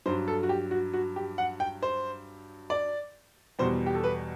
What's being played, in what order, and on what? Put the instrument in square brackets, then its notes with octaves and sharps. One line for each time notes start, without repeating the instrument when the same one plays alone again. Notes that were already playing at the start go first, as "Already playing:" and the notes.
[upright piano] G2 F#3 C5
A4
F#4
G4
F#4
F#4
G4
F#5
G5
C5
D5
E2 B2 G3 C5
G4
A4
B4